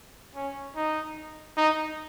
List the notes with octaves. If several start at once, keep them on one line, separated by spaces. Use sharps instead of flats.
C#4
D#4
D#4